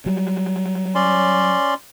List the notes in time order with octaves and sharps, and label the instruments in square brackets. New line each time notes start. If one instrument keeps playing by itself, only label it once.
[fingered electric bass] F#3 G3
[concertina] C#4 D5 C6